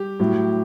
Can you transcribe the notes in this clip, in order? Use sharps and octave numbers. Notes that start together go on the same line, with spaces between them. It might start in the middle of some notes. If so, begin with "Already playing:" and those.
Already playing: G3 G4
A2 F#3